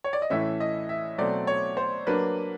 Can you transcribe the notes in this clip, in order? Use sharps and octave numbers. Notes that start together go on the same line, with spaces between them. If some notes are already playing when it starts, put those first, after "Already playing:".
C#5
D5
D#5
A2 E3 A3 C#4 E5
D#5
E5
B2 F#3 A3 C4 D5
C#5
C5
F#3 A#3 D4 B4